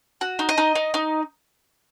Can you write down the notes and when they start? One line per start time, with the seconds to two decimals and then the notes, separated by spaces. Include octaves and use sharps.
0.21 F#4
0.39 D#4
0.49 D#5
0.58 D#4
0.75 D#4
0.94 D#4